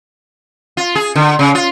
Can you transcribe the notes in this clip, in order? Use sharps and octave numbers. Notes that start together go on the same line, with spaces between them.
F4
G#4
D3
C#3
F4